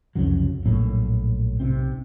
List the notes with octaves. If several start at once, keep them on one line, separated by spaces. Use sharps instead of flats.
C2 F2 C#3 F#3
A#1 A2 F#3 A#3
B1 C3 C4